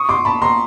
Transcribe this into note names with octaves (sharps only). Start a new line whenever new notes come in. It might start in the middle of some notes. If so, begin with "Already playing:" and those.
Already playing: C#6 D#6
C6 D6
A5 B5
A#5 C6